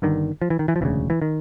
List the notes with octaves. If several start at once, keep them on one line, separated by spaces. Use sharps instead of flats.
G1 G2 D3 D#3
F3
E3
D#3
E3
F3
E1 D2 C#3 E3
E3
D#3